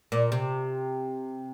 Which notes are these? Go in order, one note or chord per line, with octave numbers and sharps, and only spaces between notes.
A#2
C3